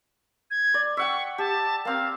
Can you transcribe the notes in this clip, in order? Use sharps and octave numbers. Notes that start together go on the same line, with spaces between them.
G#6
D5
E5 F#5 G5 C#6
G4 A5
A#3 C4 A#4 F5